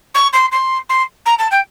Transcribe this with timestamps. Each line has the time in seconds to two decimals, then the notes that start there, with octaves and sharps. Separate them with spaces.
0.14 C#6
0.33 C6
0.52 C6
0.89 C6
1.26 A#5
1.39 A5
1.51 G5